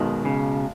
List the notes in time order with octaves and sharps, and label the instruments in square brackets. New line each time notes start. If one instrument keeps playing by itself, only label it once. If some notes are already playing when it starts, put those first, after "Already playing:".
Already playing: [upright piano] B1 B2 G#3 [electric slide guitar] D#3
[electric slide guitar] C#3